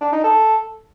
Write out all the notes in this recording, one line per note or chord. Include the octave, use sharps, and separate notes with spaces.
D4
D#4
A4